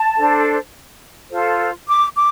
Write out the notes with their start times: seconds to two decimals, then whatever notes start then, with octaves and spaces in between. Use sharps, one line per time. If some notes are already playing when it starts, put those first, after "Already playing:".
Already playing: A5
0.17 D4 A4 C5
1.31 F4 A4 C5
1.87 D6
2.16 D6